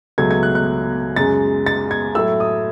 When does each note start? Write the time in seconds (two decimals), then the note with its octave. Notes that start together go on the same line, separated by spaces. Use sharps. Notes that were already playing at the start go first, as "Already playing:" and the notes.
0.18 C#2 B2 F#3 A3 G#6
0.31 G#6
0.43 F#6
0.55 F#6
1.16 F#2 C#3 G#3 A6
1.66 A6
1.91 G#6
2.15 A2 F#3 A3 E6
2.40 D#6